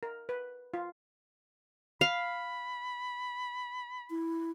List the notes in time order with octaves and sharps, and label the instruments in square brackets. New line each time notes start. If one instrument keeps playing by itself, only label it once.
[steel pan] A#4
B4
F4
[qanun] F5 [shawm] B5
[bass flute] E4